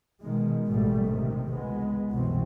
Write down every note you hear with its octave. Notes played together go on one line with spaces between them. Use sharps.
B2 D#3 G#3
A1 G#2 B2 G3 A3
C3 D#3
C#2 G#3 B3
C2 F#2 B2 E3 C4